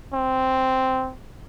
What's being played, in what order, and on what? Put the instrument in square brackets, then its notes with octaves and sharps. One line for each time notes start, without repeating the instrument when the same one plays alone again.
[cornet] C4